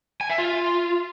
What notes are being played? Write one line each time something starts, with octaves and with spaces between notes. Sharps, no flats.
G#5
E5
F4